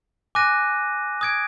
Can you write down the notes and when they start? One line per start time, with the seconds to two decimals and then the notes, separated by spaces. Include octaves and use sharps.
0.35 G#5 D6 F#6 A#6 D#7
1.21 D#6 G#6 D7